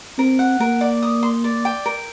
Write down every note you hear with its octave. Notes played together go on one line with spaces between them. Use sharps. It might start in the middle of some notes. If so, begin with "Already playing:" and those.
C4 A#4
F#5
A#3 A#4
D5
D#6
C6
D5
G5
A#4